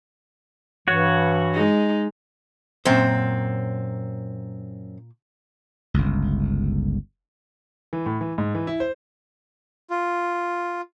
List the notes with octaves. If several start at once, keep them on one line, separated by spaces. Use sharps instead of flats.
G2 E3 F#4 C#5
G#3 D#4
F#2 A#2 C4 C5
G1 C#2
E3
A2
E3
G#2
E3
E4
C5
F4